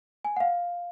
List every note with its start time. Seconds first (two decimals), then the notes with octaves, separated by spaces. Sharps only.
0.25 G#5
0.37 F#5
0.40 F5